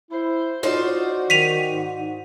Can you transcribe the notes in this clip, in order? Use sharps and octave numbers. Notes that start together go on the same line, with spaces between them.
E4 C5
D#4 F4 F#4 C5 D5
D#3 B6 D#7 F7
G#2